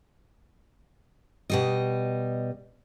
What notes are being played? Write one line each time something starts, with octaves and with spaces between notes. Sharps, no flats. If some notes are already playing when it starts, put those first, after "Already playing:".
B2 G3 D#5